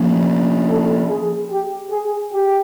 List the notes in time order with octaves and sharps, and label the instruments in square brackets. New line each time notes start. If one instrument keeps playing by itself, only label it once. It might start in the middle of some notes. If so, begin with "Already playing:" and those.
Already playing: [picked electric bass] F3 A#3 C#4
[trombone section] A4
G#4
G4
G#4
G4